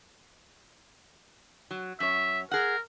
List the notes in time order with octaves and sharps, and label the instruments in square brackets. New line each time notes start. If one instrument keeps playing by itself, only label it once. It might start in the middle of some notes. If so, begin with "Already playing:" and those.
[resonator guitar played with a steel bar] F#3
[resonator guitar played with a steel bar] F#2 C#5 [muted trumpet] E5
[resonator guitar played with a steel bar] G#4 F#5 [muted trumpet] A#4